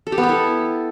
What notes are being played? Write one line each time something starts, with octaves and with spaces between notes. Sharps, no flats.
A4
G4
B3
A4
E4